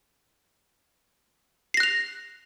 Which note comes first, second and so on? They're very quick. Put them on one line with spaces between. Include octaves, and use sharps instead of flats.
C7 A#6 F#6 F7